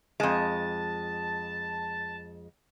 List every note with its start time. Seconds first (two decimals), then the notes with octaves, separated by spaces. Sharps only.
0.20 F2 G#3 A5